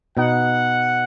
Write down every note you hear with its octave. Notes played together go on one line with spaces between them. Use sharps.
B2 B3 D#4 F#5